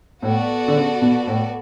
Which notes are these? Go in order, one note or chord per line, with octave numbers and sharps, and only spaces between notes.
A2 B3 F#4 A4 D5
D3
C#3
B2
A2